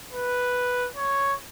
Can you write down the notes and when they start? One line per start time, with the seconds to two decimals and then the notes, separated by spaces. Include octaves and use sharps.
0.12 B4
0.96 C#5